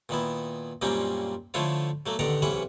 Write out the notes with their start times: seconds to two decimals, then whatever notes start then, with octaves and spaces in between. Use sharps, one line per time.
0.09 A#2 D#3 B3 E4
0.82 F#2 A#2 G3 A#3 C4 C#4
1.54 D3 F3 A3 E4 F4 C#5
2.06 F#3 A3 A#3
2.19 A1 D3 D#3 D5 F#5 A#5
2.42 B1 C3 E3 C#4 B4 F#5